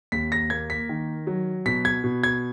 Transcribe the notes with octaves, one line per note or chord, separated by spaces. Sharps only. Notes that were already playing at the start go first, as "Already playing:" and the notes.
D#2 B6
A#6
A#3 G#6
B6
D#3
F#3
B2 B6
G#6
B2
G#6